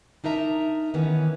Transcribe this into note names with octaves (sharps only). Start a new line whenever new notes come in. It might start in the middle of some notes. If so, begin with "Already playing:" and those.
D4 D#4 A#4 E5 A#5
D#3 E3 B3 C#4